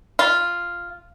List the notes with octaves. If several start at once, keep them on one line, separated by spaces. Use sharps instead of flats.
F4